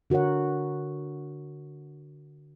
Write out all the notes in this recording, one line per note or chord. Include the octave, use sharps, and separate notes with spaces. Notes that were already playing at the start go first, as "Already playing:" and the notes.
D3 F#4 A#4 C#5 F#5